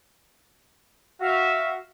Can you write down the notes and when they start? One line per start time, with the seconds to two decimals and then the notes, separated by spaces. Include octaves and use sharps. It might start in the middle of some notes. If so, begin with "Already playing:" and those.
1.21 F#4 E5 F5